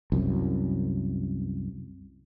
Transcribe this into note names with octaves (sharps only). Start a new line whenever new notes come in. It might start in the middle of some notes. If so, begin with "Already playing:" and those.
C2 F#2